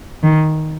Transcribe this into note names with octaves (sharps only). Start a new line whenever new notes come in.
D#3